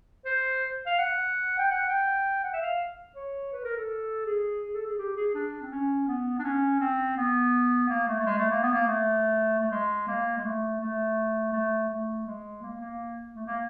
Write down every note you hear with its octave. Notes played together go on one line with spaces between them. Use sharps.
C5
F5
F#5
G5
F#5
G5
F#5
E5
F5
C#5
B4
A#4
A4
G#4
A4
G#4
G4
G#4
D4
C4
C#4
B3
D4
C#4
C4
B3
A#3
A3
A3
G#3
A3
A#3
B3
A#3
A3
A3
G#3
A#3
G#3
A3
A3
A3
A3
G#3
A#3
A#3
A3
A#3